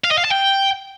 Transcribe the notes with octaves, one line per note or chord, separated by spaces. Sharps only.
F5
D#5
F5
A5
G5